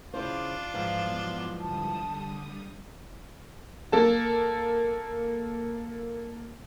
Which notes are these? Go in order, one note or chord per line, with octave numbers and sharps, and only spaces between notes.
C#3 D4 E4 F4 C5 D6
G#2 E3 F3 F5
F#3 B3
D3 G3 A5 D#6
A#3 A4 A5